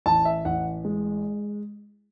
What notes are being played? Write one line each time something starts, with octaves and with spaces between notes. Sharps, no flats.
A1 A5
E5
A1 F#5
G#3